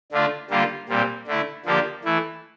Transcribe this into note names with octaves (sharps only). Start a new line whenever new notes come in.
D3 A3 D4 F4
D3 G3 A#3 F4
A#2 G3 C4
D3 A3 E4
D3 F3 A#3 D4 G4
E3 A3 E4